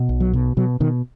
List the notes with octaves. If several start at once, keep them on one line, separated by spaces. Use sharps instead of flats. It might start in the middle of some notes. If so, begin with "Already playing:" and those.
Already playing: B2
B1
F#3
B2
B2 F#3
B2 D#3